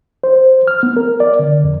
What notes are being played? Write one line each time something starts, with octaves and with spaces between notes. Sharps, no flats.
C5
F6
B3
A#4
D5
D3
F2